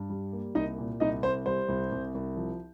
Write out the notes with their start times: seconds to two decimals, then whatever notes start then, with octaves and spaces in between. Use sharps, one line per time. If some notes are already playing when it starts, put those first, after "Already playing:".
Already playing: G2
0.10 G3
0.33 A#3
0.55 C2 D#4 D#5
0.79 A#2
1.00 C2 D#4 D#5
1.23 C2 C5
1.46 G3 C5
1.69 C2
1.92 C2
2.15 C2
2.37 F3